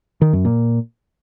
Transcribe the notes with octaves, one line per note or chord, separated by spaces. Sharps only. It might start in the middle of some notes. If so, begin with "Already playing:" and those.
D#3
F#2
A#2